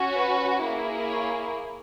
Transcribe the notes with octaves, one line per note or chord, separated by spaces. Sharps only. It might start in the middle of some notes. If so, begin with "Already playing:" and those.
Already playing: C#4 F#4
B4
A#3 E4 G#4
C#5